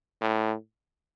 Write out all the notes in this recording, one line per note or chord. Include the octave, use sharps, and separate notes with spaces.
A2